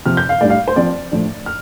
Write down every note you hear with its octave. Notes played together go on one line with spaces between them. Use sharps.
C3 F3 C4 F6
G6
F5
A2 G3 D4 D5
F5
C5
F3 C4 D5
A2 F3 D4
F6